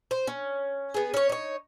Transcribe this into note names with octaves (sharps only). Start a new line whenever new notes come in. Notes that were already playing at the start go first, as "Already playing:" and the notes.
C5
C#4
B3 G#4
C#4 C#5
D#4 C#5